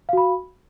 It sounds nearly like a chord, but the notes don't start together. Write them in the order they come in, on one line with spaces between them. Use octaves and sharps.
F5 F#4 B5